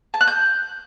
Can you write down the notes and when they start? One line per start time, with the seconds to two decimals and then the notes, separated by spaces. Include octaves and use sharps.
0.14 A5
0.21 F#6
0.27 G6